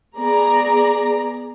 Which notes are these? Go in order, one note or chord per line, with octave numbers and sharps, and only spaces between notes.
B3 G#4 D5 A#5